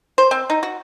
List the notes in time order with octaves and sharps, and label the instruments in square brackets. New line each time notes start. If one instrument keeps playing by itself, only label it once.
[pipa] C5
C4
D#4
F#4